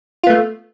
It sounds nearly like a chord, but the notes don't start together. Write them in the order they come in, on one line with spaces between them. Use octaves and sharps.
F4 B3 A3